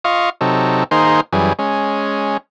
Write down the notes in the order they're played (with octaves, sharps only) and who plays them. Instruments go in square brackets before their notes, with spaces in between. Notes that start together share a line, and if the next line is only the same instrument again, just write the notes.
[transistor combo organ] F4 D#5 F5 C#6
C3 F#3 D#4 A4
D#3 A#3 D#4 G#4 C5 C6
F#2 E3 G3 G#4
G#3 C#4